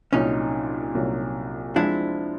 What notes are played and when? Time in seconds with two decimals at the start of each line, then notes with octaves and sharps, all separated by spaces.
0.13 C2 A#2 F#3 C#4 D#4
0.95 C2 A#2 F#3
1.76 F3 G#3 C4 D4 E4